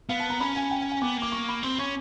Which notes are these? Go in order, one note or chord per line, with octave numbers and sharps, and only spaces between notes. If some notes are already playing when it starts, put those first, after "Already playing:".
B3 F5
A5
A#5
C#4 B5
G#5
G5
G#5
G#5
B3 D6
A#3 D6
C#6
B5
C4 C6
C#4 C#6